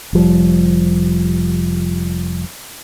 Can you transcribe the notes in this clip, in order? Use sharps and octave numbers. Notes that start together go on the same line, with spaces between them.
F1 F3 G3